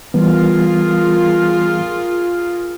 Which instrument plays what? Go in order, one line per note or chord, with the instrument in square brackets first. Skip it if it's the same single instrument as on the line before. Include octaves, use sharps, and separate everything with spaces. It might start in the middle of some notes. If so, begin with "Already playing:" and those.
[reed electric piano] E3 G3 B3 [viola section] F4 G#4 A#4